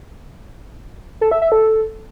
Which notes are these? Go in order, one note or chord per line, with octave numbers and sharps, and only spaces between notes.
A4
E5
E5
A4